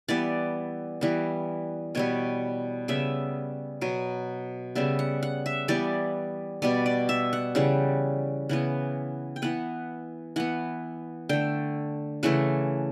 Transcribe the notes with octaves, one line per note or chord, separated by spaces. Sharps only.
E3 G3 B3 D5
E3 G3 B3
B2 G3 B3 C#5
C#3 G3 B3 E5
B2 F#3 B3
C#3 G3 B3 E5
F#5
F#5
E5
E3 G3 B3 D5
B2 G3 B3 D5
D5
E5
F#5
C#3 E3 G3 F#5
C#3 E3 B3 F#5
G5
E3 B3 F#5
E3 B3 F#5
D3 A3 G5
C#3 E3 A3 F#5